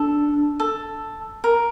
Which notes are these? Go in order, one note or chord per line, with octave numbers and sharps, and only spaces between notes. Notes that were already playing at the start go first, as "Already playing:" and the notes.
Already playing: D4 A4
A4
A#4